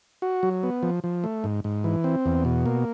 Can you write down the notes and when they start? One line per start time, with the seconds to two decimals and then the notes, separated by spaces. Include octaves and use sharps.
0.22 F#4
0.43 F#3
0.63 B3
0.83 F3
1.04 F3
1.24 A3
1.44 G#2
1.64 G#2
1.84 E3
2.04 C4
2.26 E2
2.45 B2
2.66 A#3